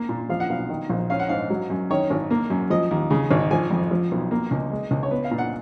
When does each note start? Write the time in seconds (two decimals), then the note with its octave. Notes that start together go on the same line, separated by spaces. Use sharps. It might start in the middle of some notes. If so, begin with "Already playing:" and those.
Already playing: A#3
0.09 A#2
0.29 F3 F5
0.40 F#5
0.50 B1 F5
0.69 D#3
0.89 A#1
1.10 C#4 F5
1.19 F#5
1.29 G#2 F5
1.50 F#3
1.70 F#2
1.90 D#3 C#5
2.10 G#1
2.31 A#3
2.50 F#2
2.70 F3 D#5
2.91 D#2
3.11 C#3
3.31 G#1
3.51 F3 G#5
3.71 F2
3.91 F3
4.11 B1
4.31 A#3
4.51 C#2
4.71 G#3
4.91 C#2
5.03 C#5
5.11 B3 B4
5.24 F5
5.31 A#2
5.38 F#5